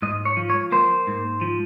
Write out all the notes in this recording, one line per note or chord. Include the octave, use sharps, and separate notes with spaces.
G#2 D#5
C#5
F3
C#5
A#3 C5
G#2
F3